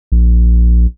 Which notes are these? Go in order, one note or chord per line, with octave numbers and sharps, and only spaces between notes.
A#1